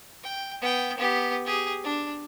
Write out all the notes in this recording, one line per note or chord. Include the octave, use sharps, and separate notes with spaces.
G5
B3 G5
B3 G4
G4 G#4
D4